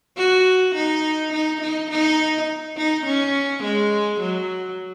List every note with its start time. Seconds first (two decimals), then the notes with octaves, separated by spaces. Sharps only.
0.17 F#4
0.75 D#4
1.33 D#4
1.61 D#4
1.91 D#4
2.77 D#4
3.06 C#4
3.63 G#3
4.21 F#3